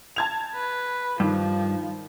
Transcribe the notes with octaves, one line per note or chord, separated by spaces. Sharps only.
A5 G#6 F7
B4
G2 D#3 F3